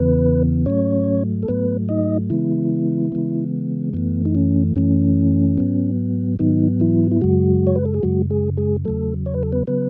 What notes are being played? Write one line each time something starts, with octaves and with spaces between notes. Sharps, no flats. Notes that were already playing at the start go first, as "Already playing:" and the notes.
Already playing: E2 C#3 E3 B3 B4
G#2 F#3 A3 C#4 C#5
A4
G#2 F#3 A3 B3 B4
D#4 D#5
C#3 E3 G#3 B3 E4
C#3 E3 G#3 B3
F#2 E3 A3 B3
D#4
C#4
F#2 E3 A3 C#4
G#2 F#3 B3
G#2 D#3 F#3 B3 D#4
E3 E4
E4
F#2 C#3 F#3 G#3 F#4
C#5
B4
A4
G#4
F#2 C#3 F#3 G#3 F#4
G#3 G#4
G#3 G#4
E2 C#3 F#3 A3 A4
C#5
B4
A4
B3 B4
C#3 F#3 B3 B4